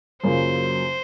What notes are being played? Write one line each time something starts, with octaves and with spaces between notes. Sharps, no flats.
F#2 C#3 F#3 A#3 F4 C5